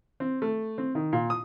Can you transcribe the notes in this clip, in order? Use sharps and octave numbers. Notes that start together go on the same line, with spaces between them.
C4
A3
C4
D#3
A#2
D#6